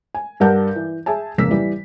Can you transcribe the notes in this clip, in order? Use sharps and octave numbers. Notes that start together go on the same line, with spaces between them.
G#5
G2 G3 A#4 F#5 A5 G6
E3
G#4 E5 G#5 A5
F1 G#2 C#3 A#3 E6 B6
E3 G3